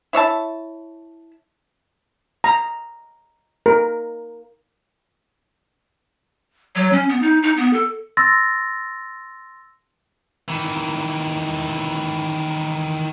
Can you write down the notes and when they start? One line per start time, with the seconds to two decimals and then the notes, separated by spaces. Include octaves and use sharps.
0.13 E4 C#5 E5 A5
2.44 A#5
3.66 A#4
6.76 F#3
6.93 C#4
7.09 B3
7.22 D#4
7.43 D#4
7.57 B3
7.73 A4
8.17 C6 E6 A6 A#6
10.48 D#3 E3